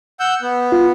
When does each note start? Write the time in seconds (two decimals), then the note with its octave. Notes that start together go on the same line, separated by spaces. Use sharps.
0.20 F#5 E6 G6
0.42 B3
0.72 F4